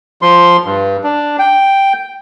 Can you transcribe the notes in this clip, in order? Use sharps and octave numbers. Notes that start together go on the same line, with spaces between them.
F3 C6
G2
D4
G5